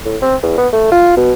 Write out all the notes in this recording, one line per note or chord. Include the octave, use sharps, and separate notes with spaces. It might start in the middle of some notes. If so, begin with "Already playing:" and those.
A2
C4
E2
B3
A3
F4
B2